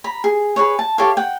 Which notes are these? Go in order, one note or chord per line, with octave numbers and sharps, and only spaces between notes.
A#5 B5
G#4
G#4 B4 C#5
A5
G4 A4 C#5 F5
F#5 G5